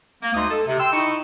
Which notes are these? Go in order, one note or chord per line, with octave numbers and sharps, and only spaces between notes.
A#3
D2 G#3 D#4 C6 D#6
A4
C3
G5 C6 E6
D#4 E4 D#5 C#6